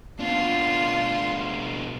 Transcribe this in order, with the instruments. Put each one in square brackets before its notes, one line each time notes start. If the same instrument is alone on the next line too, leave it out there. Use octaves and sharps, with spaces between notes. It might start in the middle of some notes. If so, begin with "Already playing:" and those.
[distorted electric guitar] B2 D4 [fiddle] F4 C6